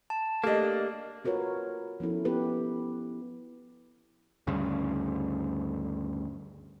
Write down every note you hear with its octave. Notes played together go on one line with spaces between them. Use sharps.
A5
A3 A#3 D4 G4 D#5
F4 F#4 A#4 B4 C#5
F3 B3 C#4 E4 A4
B3 E4 G4 B4
D2 G2 C#3